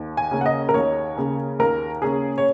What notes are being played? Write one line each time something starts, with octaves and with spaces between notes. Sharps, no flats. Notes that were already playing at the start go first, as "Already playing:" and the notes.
Already playing: D#2
G#5
C#3 A#3 C#4
F#5
D#5
A#4
D#2 C#5
C#3 A#3 C#4
D#2 A#4
C#3 A#3 C#4 G#4
C#5